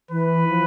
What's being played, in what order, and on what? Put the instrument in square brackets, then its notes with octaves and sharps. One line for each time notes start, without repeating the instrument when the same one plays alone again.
[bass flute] E3 [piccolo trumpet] B4
[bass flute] F3